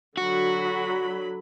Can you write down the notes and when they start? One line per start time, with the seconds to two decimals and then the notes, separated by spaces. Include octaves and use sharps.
0.17 D3 F#3 F#4 B5